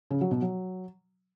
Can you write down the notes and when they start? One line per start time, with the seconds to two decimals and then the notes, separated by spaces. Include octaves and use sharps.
0.11 C#3
0.21 F#3
0.31 B2
0.42 F#3